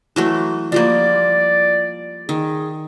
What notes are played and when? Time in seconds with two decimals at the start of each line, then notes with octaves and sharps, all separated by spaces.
0.16 E3 F#3 A3
0.72 F3 G3 A#3 D5
2.29 D#3 G#4